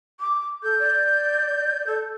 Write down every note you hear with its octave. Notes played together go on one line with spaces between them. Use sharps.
D6
A4 G6
D5
A4